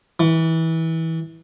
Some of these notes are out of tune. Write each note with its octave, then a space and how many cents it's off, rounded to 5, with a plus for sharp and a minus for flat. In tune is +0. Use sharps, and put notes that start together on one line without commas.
E3 -25